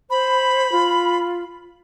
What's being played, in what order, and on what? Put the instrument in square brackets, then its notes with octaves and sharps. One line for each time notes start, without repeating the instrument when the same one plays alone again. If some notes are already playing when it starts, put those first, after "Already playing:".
[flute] C5 [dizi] B5
[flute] F4